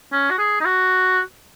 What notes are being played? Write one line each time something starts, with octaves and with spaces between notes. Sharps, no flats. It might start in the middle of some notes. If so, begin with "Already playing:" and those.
C#4
F#4
G#4
D#4
F#4